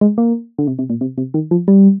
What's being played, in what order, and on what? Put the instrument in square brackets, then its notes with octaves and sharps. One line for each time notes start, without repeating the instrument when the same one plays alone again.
[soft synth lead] G#3
A#3
D3
C3
C3
A#2
C3
C3
D#3
F3
G3